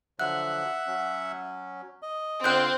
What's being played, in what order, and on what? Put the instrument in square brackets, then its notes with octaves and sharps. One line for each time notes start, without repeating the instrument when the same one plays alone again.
[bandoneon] D3 F3 F#3 [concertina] E5 F#5 [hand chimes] F#6
[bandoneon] F#3 C#4
[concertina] D#5
[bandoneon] D3 F4 [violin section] C4 [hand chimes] F#6 G6